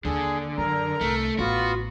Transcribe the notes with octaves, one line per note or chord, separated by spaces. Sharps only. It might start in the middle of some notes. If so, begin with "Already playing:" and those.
D#2 D3 G#4
F#2 A#4 A#5
C2 A3
A1 B3 F4 F#4